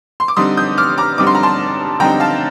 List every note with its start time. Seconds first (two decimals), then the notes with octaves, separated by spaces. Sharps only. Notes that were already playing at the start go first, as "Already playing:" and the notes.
0.20 C6
0.28 D6
0.36 D3 G3 C4 D#4 C6 D#6
0.57 D#6 G6
0.78 D6 F6
0.98 A#5 D6
1.18 D3 G3 C4 D#4 D6
1.27 C6
1.35 A#5
1.43 A5 C6
2.00 D3 G3 C4 D#4 G5 A#5
2.20 F5 A5